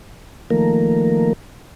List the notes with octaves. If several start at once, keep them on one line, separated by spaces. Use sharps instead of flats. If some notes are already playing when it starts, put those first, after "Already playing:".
D#3 F3 A3 A#3 A#4